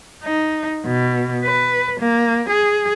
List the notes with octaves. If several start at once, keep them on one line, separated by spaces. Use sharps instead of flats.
D#4
B2
B4
A#3
G#4